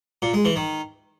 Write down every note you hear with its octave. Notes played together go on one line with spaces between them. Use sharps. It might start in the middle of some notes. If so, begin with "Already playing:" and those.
A#2
G#3
E3
D#3